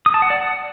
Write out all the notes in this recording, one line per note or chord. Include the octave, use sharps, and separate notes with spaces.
D#6
A5
F#5
D5
F#5